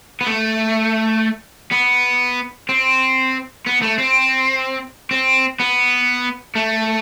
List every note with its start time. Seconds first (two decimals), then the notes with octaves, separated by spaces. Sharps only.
0.21 B3
0.27 A3
1.72 B3
2.69 C4
3.66 B3
3.82 A3
3.98 C4
5.11 C4
5.60 B3
6.56 A3